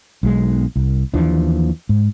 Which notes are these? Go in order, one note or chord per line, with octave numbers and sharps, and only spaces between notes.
B1 G#3
C2
D#2 E3 F3 D4
G#2